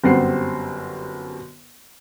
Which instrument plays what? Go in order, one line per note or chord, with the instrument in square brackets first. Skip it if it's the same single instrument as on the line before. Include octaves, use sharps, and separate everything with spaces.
[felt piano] G1 F#2 G3 C4 F#5 C7